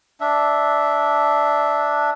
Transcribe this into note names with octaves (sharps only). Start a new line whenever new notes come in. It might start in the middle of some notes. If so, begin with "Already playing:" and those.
D4 E5